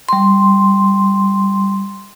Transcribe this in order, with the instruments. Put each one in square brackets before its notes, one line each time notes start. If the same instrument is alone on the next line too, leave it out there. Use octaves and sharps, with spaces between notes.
[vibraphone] G3 C6